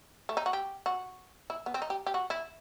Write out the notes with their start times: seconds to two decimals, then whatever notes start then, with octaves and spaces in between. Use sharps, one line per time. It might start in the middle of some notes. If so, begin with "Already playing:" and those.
0.29 A3
0.37 D#4
0.46 F#4
0.53 G4
0.86 F#4
1.50 E4
1.66 B3
1.74 C4
1.82 D#4
1.90 G4
2.07 G4
2.14 F#4
2.30 E4